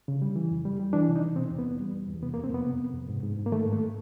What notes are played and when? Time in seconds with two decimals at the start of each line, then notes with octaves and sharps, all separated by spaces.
0.08 C#3
0.22 G3
0.36 E3
0.51 F2
0.65 G3
0.80 G3
0.93 E3 D4
1.08 C3
1.16 D#4
1.22 E3
1.36 B2 C4
1.50 E2
1.59 B3
1.65 E2
1.80 G3
1.95 E2
2.08 E2
2.22 C3 B3
2.34 A#3
2.37 F2
2.44 C4
2.52 F2 B3
2.66 C3
2.80 C3
2.94 F2
3.09 G#2
3.23 G#2
3.38 G#2
3.46 A#3
3.51 D#3 A3
3.66 G#2
3.73 A3